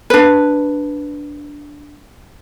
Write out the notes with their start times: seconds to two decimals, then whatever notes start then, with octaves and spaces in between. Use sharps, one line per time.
0.10 D4 B4